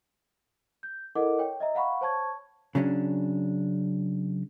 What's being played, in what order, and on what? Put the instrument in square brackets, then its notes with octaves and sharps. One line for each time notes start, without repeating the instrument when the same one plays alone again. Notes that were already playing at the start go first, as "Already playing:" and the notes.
[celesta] G6
E4 A4 A#4 D#5 F#5 D6
C#5 G5
D#5 E5 A#5
F5 F#5 B5 C#6
C5 C#5 A5 C#6 G#6
[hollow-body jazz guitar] C#3 F#3 C#4 D4